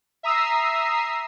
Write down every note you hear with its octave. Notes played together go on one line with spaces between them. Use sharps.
E5 A#5 D#6 E6 C7